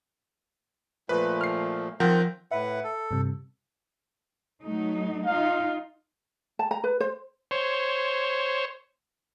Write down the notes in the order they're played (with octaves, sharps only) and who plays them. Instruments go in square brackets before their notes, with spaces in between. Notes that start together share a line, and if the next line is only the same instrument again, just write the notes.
[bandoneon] A#2 F3 A3 [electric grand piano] B4
[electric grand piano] F6 C7
[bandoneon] D#3 C4 G6 [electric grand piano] F3 A#4 F#5
[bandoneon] A2 B4 F#5 [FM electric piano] E5
[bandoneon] A4
[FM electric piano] G2 C3
[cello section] F#3 A3 D#4
[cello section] D#4 F4 [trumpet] F5
[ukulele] A5
A#5
B4
C5
[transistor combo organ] C5 C#5